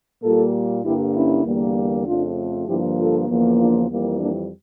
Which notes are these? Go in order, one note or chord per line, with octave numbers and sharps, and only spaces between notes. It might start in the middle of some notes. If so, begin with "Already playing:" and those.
A#2 G3 A#3 F4 A4
G2 D3 G3 A#3 E4 G4
C#4 E4
E2 D3 G3 A#3
F2 C#3 F3 A3 D4 F4
G2 D3 F3 A#3 E4 G4
F4 A4
E2 C#3 F3 A#3
D4 F4
F2 E3 G3 A#3
A#3 D4